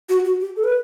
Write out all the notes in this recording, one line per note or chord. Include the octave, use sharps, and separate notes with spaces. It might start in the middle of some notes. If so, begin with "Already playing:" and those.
F#4
F#4
G4
A4
B4